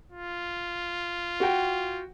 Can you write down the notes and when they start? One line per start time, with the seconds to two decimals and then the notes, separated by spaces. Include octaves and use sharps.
0.12 F4
1.40 F#4 G5